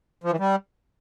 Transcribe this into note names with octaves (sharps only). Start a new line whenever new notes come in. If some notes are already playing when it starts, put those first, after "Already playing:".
F3
E3
G3